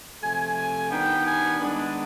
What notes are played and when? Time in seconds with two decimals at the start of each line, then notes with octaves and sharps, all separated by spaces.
0.21 C3 F3 A3 G#5
0.56 G#5
0.90 D#3 G3 B3 D4 G5
1.24 G#5
1.59 D#3 G#3 B3 D4